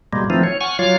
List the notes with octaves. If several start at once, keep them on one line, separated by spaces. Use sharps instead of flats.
B2 G3 G#3 A#3
E3 F3 A3 C4 D#4 F4
C#5
F#5 G#5 C#6 F6
F#3 F4 C#5 F5 D6 F6